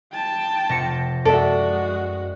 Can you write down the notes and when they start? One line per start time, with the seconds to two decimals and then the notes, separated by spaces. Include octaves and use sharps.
0.12 G5 A5
0.69 F1 A#6 C#7
1.25 F#2 G#3 F#4 A4 D5 E5